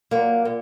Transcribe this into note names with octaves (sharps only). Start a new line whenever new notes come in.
A#2 F#3 A#3
A#2